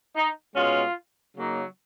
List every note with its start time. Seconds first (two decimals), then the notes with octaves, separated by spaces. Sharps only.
0.15 D#4
0.54 B2 G#3 C#4 F4
1.34 C#3 F#3 A#3 D#4